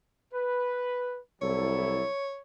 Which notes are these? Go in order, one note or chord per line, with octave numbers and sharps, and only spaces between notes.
B4
C2 F#3 E4 A4 C#5